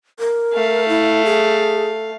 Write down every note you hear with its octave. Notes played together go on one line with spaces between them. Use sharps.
A#4
A3 F5
E4
G#4